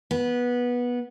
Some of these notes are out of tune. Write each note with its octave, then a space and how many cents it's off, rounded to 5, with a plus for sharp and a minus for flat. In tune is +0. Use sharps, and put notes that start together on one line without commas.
B3 -15